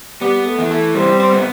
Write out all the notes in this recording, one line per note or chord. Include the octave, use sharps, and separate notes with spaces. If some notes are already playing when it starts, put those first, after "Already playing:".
G3 B3
A3
E3
A3
G3 C4
C4
B3